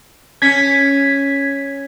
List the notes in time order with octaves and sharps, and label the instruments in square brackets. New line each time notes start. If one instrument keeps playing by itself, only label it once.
[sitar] C#4 [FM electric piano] G#6 B6